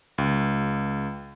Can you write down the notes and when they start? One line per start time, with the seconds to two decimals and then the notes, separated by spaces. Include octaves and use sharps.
0.18 C#2